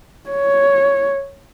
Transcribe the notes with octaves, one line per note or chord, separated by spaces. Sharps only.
C#5